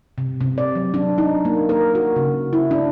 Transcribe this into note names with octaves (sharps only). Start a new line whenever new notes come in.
C3
C3
D5
F#3
D4
D#4
A#3
A#4
F#4
C#3
E4
D4